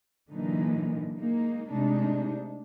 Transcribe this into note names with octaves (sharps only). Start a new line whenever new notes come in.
A#2 D3 E3 F#3 A#3 D#4
G#3 A#3 D#4
C3 G#3 A3 D4 D#4